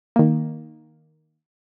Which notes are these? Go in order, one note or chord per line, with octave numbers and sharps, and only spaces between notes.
D#3 A#3